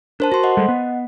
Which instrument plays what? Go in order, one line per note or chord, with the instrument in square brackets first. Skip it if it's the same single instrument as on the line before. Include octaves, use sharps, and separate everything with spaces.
[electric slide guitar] D4 [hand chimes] A#4 C5 A5
[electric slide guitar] F#4 [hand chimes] C5 C6
[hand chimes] D#5 F#5
[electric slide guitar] G3 G#3 A4
B3